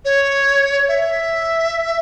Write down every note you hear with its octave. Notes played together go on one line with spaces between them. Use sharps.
C#5
E5